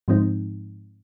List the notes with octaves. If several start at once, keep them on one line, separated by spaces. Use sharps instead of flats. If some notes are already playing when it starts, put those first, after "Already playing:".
G#2 F3 G#3 C4 D#4